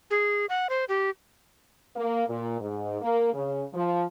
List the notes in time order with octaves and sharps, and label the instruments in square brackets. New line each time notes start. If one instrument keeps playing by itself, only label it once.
[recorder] G#4
F#5
C5
G4
[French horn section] A#3
A#2
G#2
A#3
C#3
F3